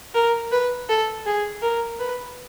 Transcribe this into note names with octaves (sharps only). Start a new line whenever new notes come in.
A#4
B4
A4
G#4
A#4
B4